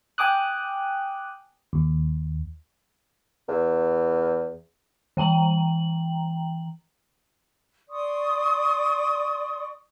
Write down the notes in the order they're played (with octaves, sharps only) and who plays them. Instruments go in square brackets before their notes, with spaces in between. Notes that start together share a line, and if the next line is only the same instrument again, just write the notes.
[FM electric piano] G5 G#5 D6 D#6 F#6
D#2
[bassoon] E2
[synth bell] E3 G5 A#5 F#7
[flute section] D5 C6 C#6 D#6